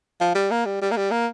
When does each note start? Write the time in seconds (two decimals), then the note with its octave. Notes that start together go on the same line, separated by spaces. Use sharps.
0.21 F3
0.35 G3
0.51 A#3
0.65 G3
0.82 G3
0.91 A#3
0.97 G3
1.11 A#3